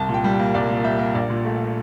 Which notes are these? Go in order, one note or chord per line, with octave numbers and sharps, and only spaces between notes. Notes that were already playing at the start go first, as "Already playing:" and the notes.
Already playing: C2 A5
A#2
G5
G3
A#3 G5
C2 D5
A#2
G3 E5
A#3
A#1 D5
A#2
A3